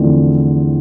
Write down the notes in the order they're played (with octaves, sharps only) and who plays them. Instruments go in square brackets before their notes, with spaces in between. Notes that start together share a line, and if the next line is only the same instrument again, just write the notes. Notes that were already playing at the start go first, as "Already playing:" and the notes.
Already playing: [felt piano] E2 D3 F3 A3 C4